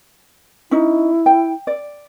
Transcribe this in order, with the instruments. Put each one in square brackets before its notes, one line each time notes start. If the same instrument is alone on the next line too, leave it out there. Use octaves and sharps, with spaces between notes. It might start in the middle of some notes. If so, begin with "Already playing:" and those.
[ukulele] C#4 D#4 [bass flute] E4
[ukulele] G5
D5